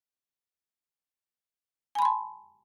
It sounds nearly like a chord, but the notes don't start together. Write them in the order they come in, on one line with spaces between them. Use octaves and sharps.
G#5 B5 C6 A5